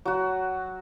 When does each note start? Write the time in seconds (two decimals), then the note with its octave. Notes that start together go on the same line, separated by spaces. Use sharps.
0.05 F#3 F#4